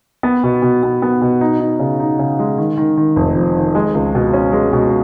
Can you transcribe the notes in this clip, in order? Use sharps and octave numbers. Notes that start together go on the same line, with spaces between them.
B3
B2
B2
B3
B3
B2
D#4
D#4
C#3
D#4
C#3
G#3
D#3
D#3
D#3
F1
F2
D#3
G#3
C#2
B2
C#4
G#3
B2